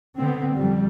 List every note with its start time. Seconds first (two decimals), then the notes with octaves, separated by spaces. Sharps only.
0.16 D3 B3 C4
0.52 F2 G3